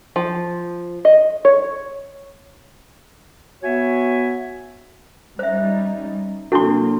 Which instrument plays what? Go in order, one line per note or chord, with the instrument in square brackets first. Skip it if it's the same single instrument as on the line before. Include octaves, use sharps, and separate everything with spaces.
[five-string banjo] F3
D#5
C#5
[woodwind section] B3 F#4 C#5 E5 G#5
[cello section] G3 C#4 D#4 [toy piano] C5 E5
[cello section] C3 F#3 A#3 [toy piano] D4 E4 A4 [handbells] F#4 C6